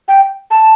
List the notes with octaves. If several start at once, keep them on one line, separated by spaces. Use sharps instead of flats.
G5
A5